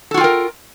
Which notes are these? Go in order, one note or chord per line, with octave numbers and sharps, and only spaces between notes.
F4 F#4 A4 A#4 G5